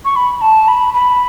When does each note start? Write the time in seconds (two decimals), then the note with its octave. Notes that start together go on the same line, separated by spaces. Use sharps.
0.05 C#6
0.16 B5
0.41 A5
0.68 B5
0.94 B5